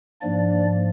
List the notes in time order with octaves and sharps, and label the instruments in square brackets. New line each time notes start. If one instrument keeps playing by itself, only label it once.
[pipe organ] G#2 F3 A#3 D4 D5